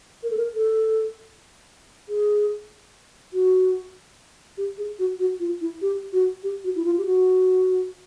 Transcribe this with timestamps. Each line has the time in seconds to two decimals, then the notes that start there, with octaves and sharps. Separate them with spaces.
0.23 A#4
0.30 A4
0.37 A#4
0.54 A4
2.09 G#4
3.33 F#4
4.57 G4
4.78 G#4
4.99 F#4
5.19 F#4
5.40 F4
5.61 E4
5.82 G4
6.13 F#4
6.43 G4
6.64 F#4
6.76 E4
6.85 F4
6.98 G4
7.05 F#4